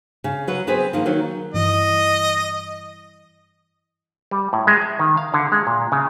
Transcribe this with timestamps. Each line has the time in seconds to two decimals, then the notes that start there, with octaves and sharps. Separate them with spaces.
0.24 C#3
0.48 F#3 B4 F#5
0.67 B3 C4 G#4 B4 C5
0.93 D#3 F3 A#3
1.06 D#3 F#3
1.54 G2 E3 D#5
4.31 G3
4.53 A2
4.67 G#3
4.81 E5
4.99 D#3
5.17 F5
5.34 D3
5.52 G#3
5.67 A#2
5.92 C#3